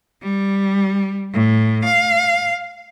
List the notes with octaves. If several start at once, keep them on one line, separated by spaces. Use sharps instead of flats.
G3
A2
F5